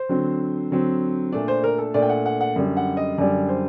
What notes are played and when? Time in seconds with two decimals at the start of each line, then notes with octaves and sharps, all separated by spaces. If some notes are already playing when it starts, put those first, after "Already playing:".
Already playing: C5
0.09 D3 F#3 C4
0.71 D3 F#3 C4
1.33 A#2 A3 D4 D5
1.48 C5
1.64 A#4
1.78 A4
1.94 A#2 A3 D4 D5
2.02 G5
2.09 F#5
2.26 F#5
2.41 F#5
2.56 F#2 D3 G3
2.77 F#5
2.97 D#5
3.18 F#2 D3 G3 D5
3.49 C5